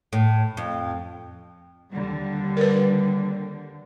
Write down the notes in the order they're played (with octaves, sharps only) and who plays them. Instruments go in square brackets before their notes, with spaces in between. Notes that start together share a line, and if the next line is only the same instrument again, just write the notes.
[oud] A2
F2
[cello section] D#2 D3 G3
[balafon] A#4 B4